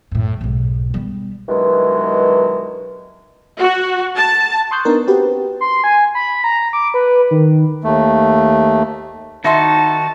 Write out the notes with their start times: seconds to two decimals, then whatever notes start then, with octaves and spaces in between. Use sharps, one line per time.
0.11 F#2 A2
0.41 B1 G#2
0.94 G3 B3
1.48 G2 B2 D#3 E3 F#3 G#3
3.58 F#4
4.16 A5
4.71 C6 C#6 D#6 F#6 G6 C7
4.85 B3 D4 D#4 A#4
5.07 C4 F#4 G4 B4
5.61 C6
5.84 G#5
6.15 B5
6.44 A#5
6.73 D6
6.94 B4
7.31 D#3
7.84 D#2 A3
9.44 D#3 D#4 E4 F#4 E5 A5 C6